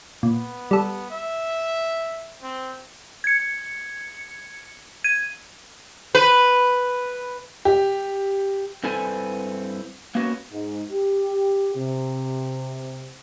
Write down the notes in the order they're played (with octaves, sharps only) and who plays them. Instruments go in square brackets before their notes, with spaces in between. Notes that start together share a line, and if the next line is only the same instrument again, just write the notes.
[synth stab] A#2 [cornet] B3
[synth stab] G3 A4
[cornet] E5
C4
[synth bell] G#6 C#7
G#6 D#7
[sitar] B4
[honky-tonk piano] G4
[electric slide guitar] G2 C4 E4 A4 B4 G#5
A#3 B3 C#4 F#4
[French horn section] G#2
G4
C3